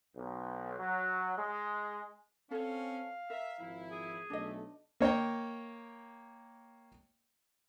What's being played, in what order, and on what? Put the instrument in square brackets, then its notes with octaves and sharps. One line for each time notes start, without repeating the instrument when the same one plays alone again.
[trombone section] B1
F#3
G#3
[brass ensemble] C4 C#4 [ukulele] A4 C#5 [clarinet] F5
[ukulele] A#4 [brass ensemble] E5
[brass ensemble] G#1 F3 E4
[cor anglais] G#4
[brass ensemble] B1 A3 [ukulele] D4 D#5
[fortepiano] A#3 C#5 D#5 G5